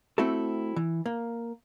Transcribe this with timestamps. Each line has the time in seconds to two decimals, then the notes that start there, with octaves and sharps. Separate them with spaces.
0.18 A3 C4 E4 F#4 A4
0.76 E3
1.06 A#3